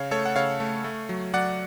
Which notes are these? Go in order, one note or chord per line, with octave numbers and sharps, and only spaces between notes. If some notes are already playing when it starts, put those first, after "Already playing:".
Already playing: C#3 C#5 F5
A3 A4 C#5
F#5
C#3 C#5 F5
A3
A3
F#3
F#3 D5 F#5